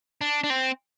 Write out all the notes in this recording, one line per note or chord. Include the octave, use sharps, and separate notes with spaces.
D4
D4
C4